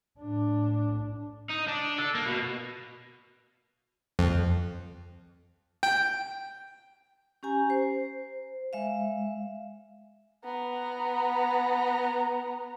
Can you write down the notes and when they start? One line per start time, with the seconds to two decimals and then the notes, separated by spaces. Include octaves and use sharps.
0.20 A2 D4
1.50 D#4
1.69 D4
1.99 A4
2.15 A#3
2.26 B2
4.19 F2
5.83 G5
7.43 C#4 G4 G#5 A#5
7.70 C5
8.73 G#3 E5 F5
10.44 B3 A#5